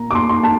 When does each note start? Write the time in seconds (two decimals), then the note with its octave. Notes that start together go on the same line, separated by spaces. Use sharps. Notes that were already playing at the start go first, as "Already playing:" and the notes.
Already playing: A#2 A#3 A#5
0.11 D6
0.15 C6
0.29 C6
0.43 A5